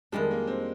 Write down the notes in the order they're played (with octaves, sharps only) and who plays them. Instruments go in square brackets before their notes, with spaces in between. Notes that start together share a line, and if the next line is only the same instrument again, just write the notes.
[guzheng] F2 D#3 G3 D4 [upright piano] G#3
[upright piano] A#3
C4